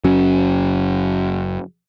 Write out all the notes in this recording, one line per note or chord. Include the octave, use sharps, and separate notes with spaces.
F#1 F#3 C#4